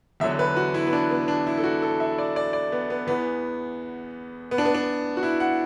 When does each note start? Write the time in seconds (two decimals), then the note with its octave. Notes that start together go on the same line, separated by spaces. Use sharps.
0.20 E2 D3 F#3 E5
0.39 B4
0.57 F#4
0.74 E4
0.87 B3
0.93 D4
1.11 B3
1.28 D4
1.47 E4
1.58 A4
1.63 F#4
1.82 A4
2.00 E5
2.18 D5
2.36 D5
2.53 D5
2.72 B3
2.90 B3
3.07 E2 E3 B3
4.51 B3
4.58 D4
4.65 B3
4.75 D4
5.17 F#4
5.23 E4
5.40 F#5